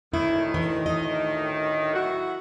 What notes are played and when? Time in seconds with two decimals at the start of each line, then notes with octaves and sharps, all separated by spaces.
0.14 D2 A2 D#3 E4
0.54 E3
0.86 D#5
1.94 F#3 E4 F#4